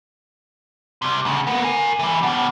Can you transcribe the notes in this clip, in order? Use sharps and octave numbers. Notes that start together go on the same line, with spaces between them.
C3 G3
D2 C#3
A#3 B3
A#4 G#5
E3 G3
B2 G3